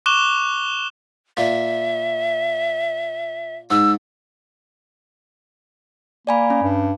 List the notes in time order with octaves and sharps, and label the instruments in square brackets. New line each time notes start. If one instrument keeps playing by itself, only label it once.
[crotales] C#6 D6 F#6 E7 G7
[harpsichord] A#2 [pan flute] E5
[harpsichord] G#2 [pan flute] E6
[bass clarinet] A#3 [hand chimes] D5 G#5 B5
[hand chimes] C#4
[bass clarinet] G2